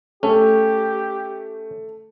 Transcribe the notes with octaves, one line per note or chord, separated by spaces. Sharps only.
A3 C#4 G4